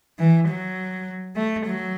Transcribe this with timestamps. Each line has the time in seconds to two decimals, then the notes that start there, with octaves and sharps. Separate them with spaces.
0.19 E3
0.48 F#3
1.36 A3
1.65 F#3